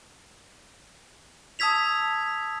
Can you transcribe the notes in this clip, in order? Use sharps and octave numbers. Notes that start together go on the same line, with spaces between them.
A5 D#6 E6 G#6 B6 F7